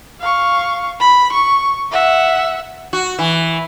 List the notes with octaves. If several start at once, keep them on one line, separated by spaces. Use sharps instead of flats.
F5 C#6
B5
C#6
E5 F#5
F#4
E3